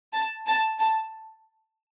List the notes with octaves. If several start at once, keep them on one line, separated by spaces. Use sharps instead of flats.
A5
A5
A5